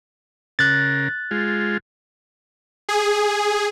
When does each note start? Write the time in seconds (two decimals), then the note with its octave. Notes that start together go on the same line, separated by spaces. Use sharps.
0.59 C#3 A#4 F#6 A6
1.31 G#3 F4
2.89 G#4